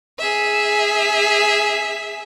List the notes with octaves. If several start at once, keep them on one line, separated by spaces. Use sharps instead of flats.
G#4 E5